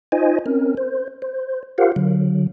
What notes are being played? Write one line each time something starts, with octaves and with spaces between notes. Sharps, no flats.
D#4 F4 C5 D#5 G#5
C4 C#4 A#4
C5
C5
F4 G4 A#4 C5 F5 F#5
D3 F#3